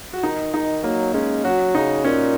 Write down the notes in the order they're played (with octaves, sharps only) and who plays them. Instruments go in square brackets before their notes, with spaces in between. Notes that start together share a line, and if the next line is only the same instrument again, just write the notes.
[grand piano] F#4
[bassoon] D#3 [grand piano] D#4
[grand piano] D#4
[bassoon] F#3 [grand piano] A#3
[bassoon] G#3 [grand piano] C#4
[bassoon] F#3 [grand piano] F#4
[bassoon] C#3 [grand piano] D#4
[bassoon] A#2 [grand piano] C#4